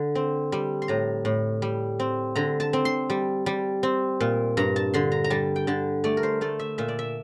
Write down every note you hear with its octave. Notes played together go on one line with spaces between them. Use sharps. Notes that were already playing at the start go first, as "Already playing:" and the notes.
Already playing: D3
C4
G3
C6
A2 A#5
A2
G3
C4
D3 A#5
A5
C4
C6
G3
G3
C4
A#2
G2 A#5
A5
D3 C6
A#5
A#5
G3 A5
G5
D3 A5
A3 D5
A#4
C5
A3 A4
E5
A#2 E5
D5
E5